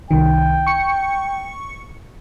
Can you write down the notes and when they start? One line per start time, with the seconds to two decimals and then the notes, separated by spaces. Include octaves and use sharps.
0.11 C2 D#3 G5
0.67 C#6 C#7